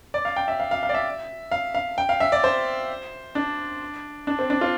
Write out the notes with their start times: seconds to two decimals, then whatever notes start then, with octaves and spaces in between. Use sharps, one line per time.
0.14 D5
0.25 F5
0.36 G5
0.48 E5
0.60 F5
0.71 F5
0.83 F5
0.89 D5
0.94 E5
1.51 F5
1.74 F5
1.98 G5
2.09 F5
2.20 E5
2.32 D5
2.44 C5
3.35 D4
4.27 D4
4.39 C4
4.50 D4
4.61 F4